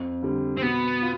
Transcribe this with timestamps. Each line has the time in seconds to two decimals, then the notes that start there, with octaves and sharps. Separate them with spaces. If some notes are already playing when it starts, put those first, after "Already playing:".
Already playing: F2
0.23 D3 G3
0.57 C4
0.62 B2 B3
1.02 F4